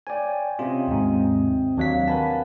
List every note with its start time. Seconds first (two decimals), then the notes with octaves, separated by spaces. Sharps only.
0.07 C#5 D5 G5 G#5
0.59 C3 C#4 F4 D#5
0.88 D#2 G#2 D#6
1.77 D#2 F#3 D4 F5 B6
2.08 A#4 B4 F#5 G#5 A5